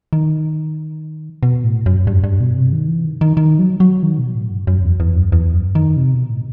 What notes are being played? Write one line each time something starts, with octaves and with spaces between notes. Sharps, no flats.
D#3
B2
A2
F#2
G2
G2
B2
C3
D#3
E3
D#3
D#3
D#3
F#3
F#3
D#3
B2
A2
G2
F#2
E2
E2
F#2
E2
F#2
D#3
C3
B2
A2